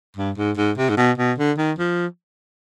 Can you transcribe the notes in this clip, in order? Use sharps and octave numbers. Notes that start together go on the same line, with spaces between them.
G2
G#2
G#2
C3
G#2
B2
B2
D3
D#3
F3